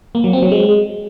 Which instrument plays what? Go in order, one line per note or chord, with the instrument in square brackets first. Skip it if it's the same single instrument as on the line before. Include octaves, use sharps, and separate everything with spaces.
[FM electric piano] A#3
F#3
C4
F#3
G#3